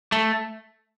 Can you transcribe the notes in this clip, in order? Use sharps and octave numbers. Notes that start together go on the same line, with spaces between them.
A3